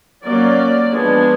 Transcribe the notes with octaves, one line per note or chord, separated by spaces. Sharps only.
F#3 A#3 C#4 D5
F3 G#3 B3 D4